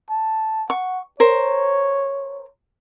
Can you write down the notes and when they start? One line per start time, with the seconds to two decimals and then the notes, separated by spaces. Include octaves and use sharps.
0.10 A5
0.70 F#5 C#6
1.20 A#4 C5 C#5